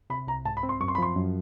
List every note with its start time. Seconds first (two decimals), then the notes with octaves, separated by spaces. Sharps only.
0.10 C3 B5
0.27 C2 A#5
0.45 G#2 A5
0.57 B5
0.63 C4
0.69 C6
0.80 F#2 C#6
0.88 C6
0.95 B5
0.98 F3 C6
1.16 F#2